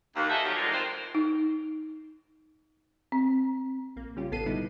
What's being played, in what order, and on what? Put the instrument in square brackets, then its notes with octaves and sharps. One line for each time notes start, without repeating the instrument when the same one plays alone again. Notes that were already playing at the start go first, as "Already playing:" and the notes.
[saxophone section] D#2
F3 G#4 A4 D#5 E5 F#5
C3 D#3 F#3 G3
D3 D#3 G3 G#3 A#3 F4
D#3 C4 F4 B4 C5
[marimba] D#4
C4
[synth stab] A#1 A#3
C#3 G3 C#4 F4 G4
A1 B3 A4 C7 D#7
B2 D3 G3 B3 D#4 E4